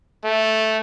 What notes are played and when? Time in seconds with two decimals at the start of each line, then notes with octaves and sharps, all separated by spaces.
0.24 A3